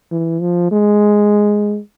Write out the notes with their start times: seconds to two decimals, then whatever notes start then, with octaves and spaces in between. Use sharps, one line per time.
0.12 E3
0.41 F3
0.71 G#3